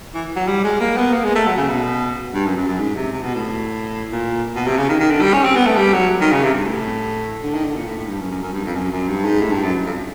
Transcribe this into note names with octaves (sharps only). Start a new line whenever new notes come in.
E3
F#3
G3
G#3
A#3
B3
A#3
G#3
A3
F#3
C#3
B2
G2
F#2
F#2
F#2
G#2
C3
C3
B2
A2
A#2
B2
C3
C#3
D#3
D#3
D3
G3
C#4
C4
B3
A3
G3
F#3
D#3
C#3
C3
G2
A2
D3
D#3
D3
A#2
A2
A2
G2
F#2
F#2
F#2
G2
F2
F#2
F#2
G2
G#2
A2
G2
F#2
F2